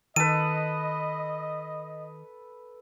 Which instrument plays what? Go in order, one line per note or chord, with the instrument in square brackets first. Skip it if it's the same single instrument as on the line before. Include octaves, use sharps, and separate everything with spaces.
[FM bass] D#3 [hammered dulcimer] A4 B4 [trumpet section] D#5 [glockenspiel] D#7